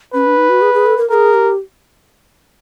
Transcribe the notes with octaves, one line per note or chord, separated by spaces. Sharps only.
C#4 B4
D4
D#4
F#4
G#4
G#4
A4
A#4
G#4 A4 A#4
G4